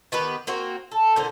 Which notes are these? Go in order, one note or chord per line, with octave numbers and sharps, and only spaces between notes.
D#3 B3 G4 B4
A#3 C4 F#4
A4
A#2 D3 C5